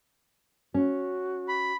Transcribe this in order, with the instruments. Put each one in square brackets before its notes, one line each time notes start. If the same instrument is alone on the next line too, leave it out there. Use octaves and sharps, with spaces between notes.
[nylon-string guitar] C#4 [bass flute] F#4
[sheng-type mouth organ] B5